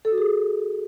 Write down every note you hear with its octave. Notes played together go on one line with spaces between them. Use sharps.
A4
F#4
G#4